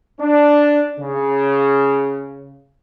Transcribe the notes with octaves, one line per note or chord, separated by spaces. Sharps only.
D4
C#3